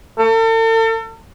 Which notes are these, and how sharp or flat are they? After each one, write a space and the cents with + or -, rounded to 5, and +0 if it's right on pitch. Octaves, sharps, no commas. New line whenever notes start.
A4 +40